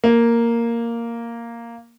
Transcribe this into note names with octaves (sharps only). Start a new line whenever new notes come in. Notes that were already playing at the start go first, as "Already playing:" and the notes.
A#3